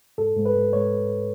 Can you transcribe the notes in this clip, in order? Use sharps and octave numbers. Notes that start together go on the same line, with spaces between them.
G#2 A4
G#2
B4
G#2
G#2 C#5